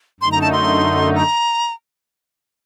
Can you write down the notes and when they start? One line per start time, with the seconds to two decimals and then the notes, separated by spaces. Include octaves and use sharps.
0.20 F#2 D3 A3 D#4 C6
0.32 A#5
0.42 A5
0.53 C6
1.16 A#5